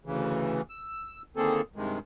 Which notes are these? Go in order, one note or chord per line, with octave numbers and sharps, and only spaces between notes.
D2 C#3 E3
E6
D3 D#3 A#3 C4 G#4 A4
G2 C3 D#3 G#3